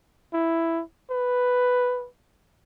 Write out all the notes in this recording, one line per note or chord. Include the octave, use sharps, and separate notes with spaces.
E4
B4